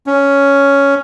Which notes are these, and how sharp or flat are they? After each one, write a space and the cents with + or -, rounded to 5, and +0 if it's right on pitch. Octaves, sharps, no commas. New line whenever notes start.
C#4 +5